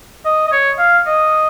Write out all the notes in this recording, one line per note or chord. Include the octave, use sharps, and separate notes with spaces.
D#5
D#5
C#5
F5
D#5